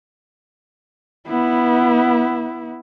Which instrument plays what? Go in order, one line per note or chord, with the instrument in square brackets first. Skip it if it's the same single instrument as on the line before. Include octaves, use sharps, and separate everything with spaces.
[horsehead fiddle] B3 E4